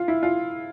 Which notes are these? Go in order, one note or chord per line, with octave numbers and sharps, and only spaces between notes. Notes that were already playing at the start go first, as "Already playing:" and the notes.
Already playing: F4
E4
F4